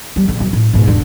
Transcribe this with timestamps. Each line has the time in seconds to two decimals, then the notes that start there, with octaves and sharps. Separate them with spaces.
0.16 G3
0.28 A#1 D3
0.40 F#2
0.53 A2
0.73 G#2 B2
0.87 E1 D3